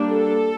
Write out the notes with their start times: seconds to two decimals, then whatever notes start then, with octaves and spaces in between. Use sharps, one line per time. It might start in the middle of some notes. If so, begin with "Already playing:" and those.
Already playing: G3 A#3 D4
0.11 A4